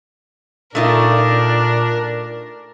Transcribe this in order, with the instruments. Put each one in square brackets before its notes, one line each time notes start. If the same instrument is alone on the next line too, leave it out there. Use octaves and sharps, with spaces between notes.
[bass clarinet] A#2 [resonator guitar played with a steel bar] A3 D#4 F4 [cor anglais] D4 [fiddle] A#4